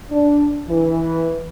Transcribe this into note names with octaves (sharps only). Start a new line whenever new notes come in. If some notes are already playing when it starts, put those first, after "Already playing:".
D4
E3